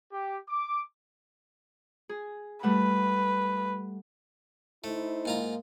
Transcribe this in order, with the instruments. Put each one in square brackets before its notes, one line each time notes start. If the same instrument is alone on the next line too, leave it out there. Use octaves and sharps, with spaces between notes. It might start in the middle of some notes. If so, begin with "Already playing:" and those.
[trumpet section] G4
D6
[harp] G#4
[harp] G3 A3 F#5 [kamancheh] B4
[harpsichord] A3 [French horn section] D#4 E4 C5
[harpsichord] G#2 F4 A#5 [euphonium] A#3